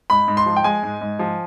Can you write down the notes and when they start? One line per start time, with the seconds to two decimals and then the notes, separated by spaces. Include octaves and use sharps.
0.10 G#2 B5
0.28 G#2
0.37 C6
0.46 F3
0.56 G5
0.64 G#3 G#5
0.83 G#2
1.01 G#2
1.19 F3